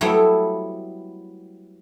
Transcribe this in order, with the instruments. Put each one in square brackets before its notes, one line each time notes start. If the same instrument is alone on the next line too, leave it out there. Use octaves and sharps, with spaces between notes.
[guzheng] F#3 G3 A3 B3 C4 E4